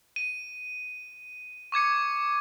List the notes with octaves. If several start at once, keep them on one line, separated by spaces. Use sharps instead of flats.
D#7
C#6 D6 G#6 C#7